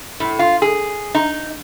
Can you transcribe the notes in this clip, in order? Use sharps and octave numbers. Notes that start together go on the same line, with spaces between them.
A2
F4
G#4
D#4